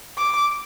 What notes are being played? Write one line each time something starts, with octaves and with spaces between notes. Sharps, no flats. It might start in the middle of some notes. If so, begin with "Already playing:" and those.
D6